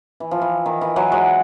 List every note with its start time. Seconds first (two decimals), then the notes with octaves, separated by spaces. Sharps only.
0.20 E3
0.31 F3
0.42 E3
0.66 D#3
0.81 E3
0.96 E3 F#3
1.12 F#3 G#3